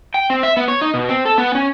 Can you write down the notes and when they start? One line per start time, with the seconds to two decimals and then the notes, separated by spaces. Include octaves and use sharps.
0.14 G5
0.30 C4
0.43 E5
0.57 B3
0.68 C#5
0.81 D#4
0.94 B2
1.09 C4
1.25 A4
1.38 B3
1.55 C#4